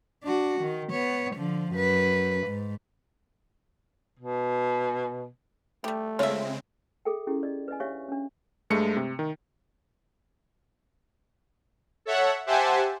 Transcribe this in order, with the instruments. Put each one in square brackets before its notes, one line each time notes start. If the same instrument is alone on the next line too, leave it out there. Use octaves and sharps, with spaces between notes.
[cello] D4 F#4
D#3
B3 C#5
D3 F3
F#2 B4
G#2
[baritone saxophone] B2
[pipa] G3 G4 [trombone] A3
[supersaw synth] C#3 G#3 C4 [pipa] F4 E5 [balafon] C#5
[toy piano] G#4 A4 E5 G5
C#4 E4 G4 G#4
D5 D#5
B4 D5 D#5 G#5
D4 G4 C#5 E5 F5 C#6
C#4 D4
[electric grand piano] G2 G#3 A3 C#7
C3
D#3
[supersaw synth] A4 C#5 E5 F#5
G4 C5 E5 F#5 G#5 A5